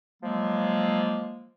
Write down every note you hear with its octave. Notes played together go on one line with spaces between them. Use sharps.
F3 F#3 G#3 A#3